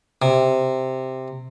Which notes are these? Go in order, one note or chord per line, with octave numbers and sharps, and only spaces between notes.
C3